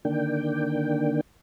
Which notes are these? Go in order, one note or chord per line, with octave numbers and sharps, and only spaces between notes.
D3 D#3 A#3 D4 G5